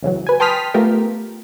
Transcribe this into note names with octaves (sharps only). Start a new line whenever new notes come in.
C#2 C#3 E3 F#3
B4 G#5
G5 A5 C6 D#6 F6 B6
A3 B3 F4 G4 A#4